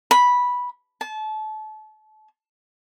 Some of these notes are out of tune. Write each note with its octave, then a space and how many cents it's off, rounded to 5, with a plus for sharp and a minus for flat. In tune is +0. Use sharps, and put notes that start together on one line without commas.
B5 -10
A5 -30